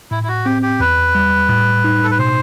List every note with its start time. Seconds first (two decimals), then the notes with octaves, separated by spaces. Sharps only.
0.11 A2 E4
0.23 E4
0.28 F#4
0.45 C4 G4
0.62 G4
0.80 E2 B4
1.15 G3
1.49 A2
1.84 D#4
2.04 A4
2.11 B4
2.19 B2 C5